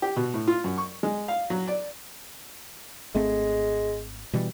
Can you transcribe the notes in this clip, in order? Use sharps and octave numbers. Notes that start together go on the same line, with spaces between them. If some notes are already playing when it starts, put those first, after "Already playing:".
G4
B2
A2
F4
F#2
C#6
G#3
F5
F#3
D5
G#1 G#3 A3 C4
B2 E3 G3